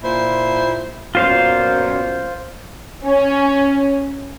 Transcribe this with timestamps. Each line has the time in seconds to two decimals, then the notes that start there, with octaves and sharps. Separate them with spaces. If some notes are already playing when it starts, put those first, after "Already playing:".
0.03 A#2 E4 C5
1.15 F#2 A#2 B3 F4 C5 F5
3.05 C#4